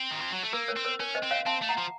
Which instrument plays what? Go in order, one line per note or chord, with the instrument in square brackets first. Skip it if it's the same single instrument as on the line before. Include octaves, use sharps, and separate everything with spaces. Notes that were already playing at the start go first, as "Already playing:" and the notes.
Already playing: [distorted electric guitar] C4
D#3
F3
F#3
A3
[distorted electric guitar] A#3 [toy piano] A#4
[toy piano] A#4 C#5
[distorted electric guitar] C4
[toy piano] A#4 C#5
[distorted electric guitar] C#4 [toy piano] A#4 C#5
[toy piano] C5 D#5
[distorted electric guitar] C4
[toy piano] C#5 F5
[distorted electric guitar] C4 [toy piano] F5 A5
[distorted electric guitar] A3
[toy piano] F#5 A#5
[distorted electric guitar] F3